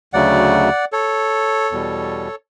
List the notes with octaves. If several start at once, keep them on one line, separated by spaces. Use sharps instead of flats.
D2 C#3 F#3 A3 D5 F#5
A4 C#5
E2 B2 G3